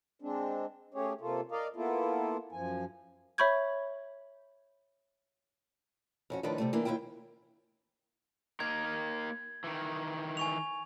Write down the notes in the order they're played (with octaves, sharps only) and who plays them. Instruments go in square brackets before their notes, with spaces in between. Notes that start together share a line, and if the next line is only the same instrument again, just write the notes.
[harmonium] G#3 C4 D4
A3 C#4 G4 G#4 C#5
C3 A#3 F4 A4
A#4 D5 D#5 F5
A#3 B3 E4 F4 A4
F#2 F3 G#5
[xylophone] C#5 E5 B5 C#6 G6 G#6
[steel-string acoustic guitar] F2 C#4 F#4
A2 D#3 F3 D4 D#4 B4
C3 G3 A3
E3 A#3 B3 D4
D#2 F3 E4 F4 G5
[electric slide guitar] A#3 D#4 A#4 [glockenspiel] G#6
[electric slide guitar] D#3 E3
[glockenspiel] G#5 C#6 F7